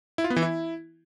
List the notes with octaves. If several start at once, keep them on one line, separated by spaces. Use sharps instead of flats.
E4
F4
B3
E3
E4